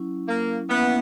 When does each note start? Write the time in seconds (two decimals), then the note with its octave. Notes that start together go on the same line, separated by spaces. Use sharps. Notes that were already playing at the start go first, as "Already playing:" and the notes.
Already playing: F#3 C#4 E4
0.28 A#3
0.69 A#3 B3 C#4 E4 B4 E5